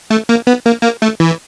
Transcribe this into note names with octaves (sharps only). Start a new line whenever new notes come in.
A3
A#3
B3
A#3
A#3
A3
E3